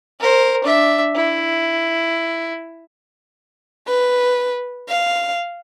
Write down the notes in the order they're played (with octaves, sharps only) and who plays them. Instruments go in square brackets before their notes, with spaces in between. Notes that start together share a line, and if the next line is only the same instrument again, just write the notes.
[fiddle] A#4 C5
D4 E5
E4
[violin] B4
F5